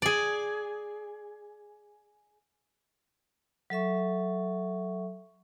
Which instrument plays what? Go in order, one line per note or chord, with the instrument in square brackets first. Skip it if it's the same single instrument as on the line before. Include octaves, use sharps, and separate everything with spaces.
[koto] G#4 D5
[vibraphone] F#3 A4 E5 C#6